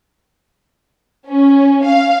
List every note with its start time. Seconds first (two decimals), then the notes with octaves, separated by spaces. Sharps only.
1.29 C#4
1.84 F5